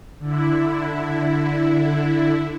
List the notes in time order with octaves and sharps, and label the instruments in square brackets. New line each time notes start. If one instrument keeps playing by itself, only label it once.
[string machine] D3 E4